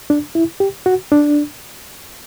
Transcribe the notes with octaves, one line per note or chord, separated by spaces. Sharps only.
D4
E4
G4
F#4
D4